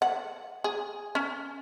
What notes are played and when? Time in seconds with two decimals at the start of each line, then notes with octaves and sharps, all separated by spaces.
0.02 F#5
0.64 G#4
1.15 C#4